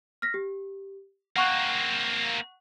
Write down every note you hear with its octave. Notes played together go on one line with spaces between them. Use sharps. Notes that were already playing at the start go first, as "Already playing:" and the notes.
F6 A#6 B6
G4
A#3 C4 F#5 C#6 F#6